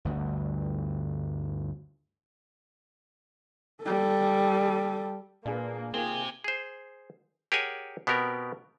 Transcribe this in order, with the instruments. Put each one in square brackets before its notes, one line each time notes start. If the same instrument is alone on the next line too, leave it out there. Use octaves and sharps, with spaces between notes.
[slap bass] G1 D2 G2
[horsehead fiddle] G3 A4
[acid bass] A#2 [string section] A#3 [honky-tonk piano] D4 G#4 B4
[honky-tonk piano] D#3 A#3 F4 [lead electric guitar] C4 G4 [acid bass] G#4 [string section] G#5
[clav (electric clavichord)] G#4 C5
G4 G#4 A#4 C#5 F#5 G#5
B2 B3 C4 G4 A#4